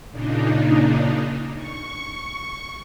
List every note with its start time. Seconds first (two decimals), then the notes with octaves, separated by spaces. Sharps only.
0.11 A#2 C#3 D4 D#4
1.56 C#6